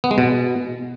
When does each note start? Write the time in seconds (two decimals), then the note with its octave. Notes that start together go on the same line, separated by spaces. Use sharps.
0.04 B3
0.11 G#3
0.18 B2